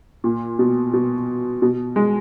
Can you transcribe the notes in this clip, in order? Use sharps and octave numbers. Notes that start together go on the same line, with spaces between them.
A#2
B2
B2
B2
G#3